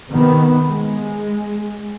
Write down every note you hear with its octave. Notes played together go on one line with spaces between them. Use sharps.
C3 D#3 B3
G#3